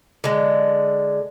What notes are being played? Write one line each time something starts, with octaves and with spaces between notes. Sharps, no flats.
D3 G#3